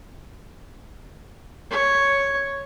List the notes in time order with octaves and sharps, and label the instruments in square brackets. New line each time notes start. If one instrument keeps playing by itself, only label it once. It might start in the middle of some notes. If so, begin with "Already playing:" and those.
[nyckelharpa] C#5